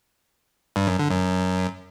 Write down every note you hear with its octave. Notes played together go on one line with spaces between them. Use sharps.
G2
F#2
D3
F#2